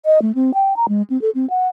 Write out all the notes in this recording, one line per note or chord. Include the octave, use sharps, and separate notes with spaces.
D#5
A3
C4
G5
A#5
G#3
C4
A4
C4
F#5